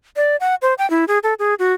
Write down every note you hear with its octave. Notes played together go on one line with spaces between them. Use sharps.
D5
F#5
C5
G5
E4
G#4
A4
G#4
F#4